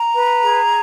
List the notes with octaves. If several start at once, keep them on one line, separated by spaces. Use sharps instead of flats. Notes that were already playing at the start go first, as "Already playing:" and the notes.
Already playing: A#5
B4
G#4